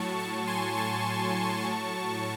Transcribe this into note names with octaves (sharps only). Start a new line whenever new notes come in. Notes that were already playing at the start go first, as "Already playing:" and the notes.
Already playing: A2 F#3 A5 C#6
A5 C#6
G#5 C6
A5 C#6
A2 F#3